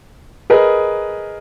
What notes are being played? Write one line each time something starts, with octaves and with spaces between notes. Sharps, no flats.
G#4 A#4 B4 D#5